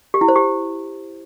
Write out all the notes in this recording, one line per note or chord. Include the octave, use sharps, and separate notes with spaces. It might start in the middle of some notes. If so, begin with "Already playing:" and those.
G4
E4
C5
G4